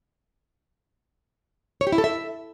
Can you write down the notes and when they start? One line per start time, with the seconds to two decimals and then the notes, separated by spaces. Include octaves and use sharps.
1.81 C#5
1.87 G4
1.92 E4
1.98 A4
2.04 E5